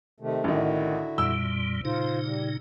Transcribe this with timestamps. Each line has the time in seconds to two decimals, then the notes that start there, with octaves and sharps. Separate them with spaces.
0.20 C3 D#3 A3
0.44 A1 D3 D#3 E4 F#4
1.18 F2 A#2 G3 E6
1.85 A#2 C#3 D#4 F4 C5
2.25 G3